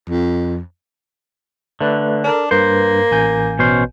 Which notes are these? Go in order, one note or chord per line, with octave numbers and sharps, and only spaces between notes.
F2
D3 A3 B4 D5
D4 A4 A#4
G2 A#3 B4 C5
A1 G#5 G6
B2 C#4 C5